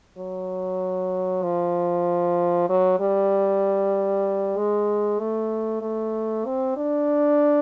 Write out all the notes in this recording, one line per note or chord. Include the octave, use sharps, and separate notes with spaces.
F#3
F3
F#3
G3
G#3
A3
A3
C4
D4